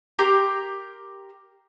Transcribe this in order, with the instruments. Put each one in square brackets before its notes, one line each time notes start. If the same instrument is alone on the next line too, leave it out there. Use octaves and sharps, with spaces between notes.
[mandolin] G4 A#4 A#5 C6